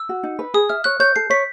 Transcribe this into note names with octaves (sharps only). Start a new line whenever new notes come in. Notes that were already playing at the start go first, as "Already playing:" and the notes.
Already playing: E6
F#4
D#4
B4
G#4 D#6
E5 F6
C#5 F#6
C#5 G6
A4 C7
C#5 B6